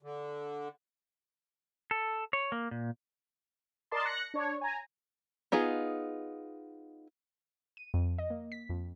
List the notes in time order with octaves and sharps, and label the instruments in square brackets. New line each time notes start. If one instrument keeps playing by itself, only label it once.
[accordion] D3
[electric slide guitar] A4
C#5
A#3
A#2
[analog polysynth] A#4 D5 D#5 A5 C6
F#6 A#6 C#7
D4 C#5
G#5 A#5
[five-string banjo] B3 D#4 F4 G#4
[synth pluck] D#7
F2
D#5
A#3
B6
F2